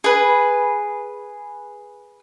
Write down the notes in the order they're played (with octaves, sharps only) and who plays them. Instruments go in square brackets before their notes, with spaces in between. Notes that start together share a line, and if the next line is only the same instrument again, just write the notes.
[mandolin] G#4 B4